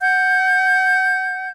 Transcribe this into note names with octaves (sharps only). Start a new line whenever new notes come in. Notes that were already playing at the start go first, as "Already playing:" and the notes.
F#5 G6